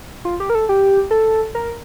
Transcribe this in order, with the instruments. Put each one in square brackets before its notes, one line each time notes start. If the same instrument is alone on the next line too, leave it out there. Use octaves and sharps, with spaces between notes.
[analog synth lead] F4
G4
A#4
A4
G4
A4
A#4